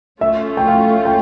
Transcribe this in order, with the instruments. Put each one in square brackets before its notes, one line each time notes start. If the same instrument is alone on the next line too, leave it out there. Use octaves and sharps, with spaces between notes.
[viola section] A3 C#4 F4 [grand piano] E5
[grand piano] G5
F5
G5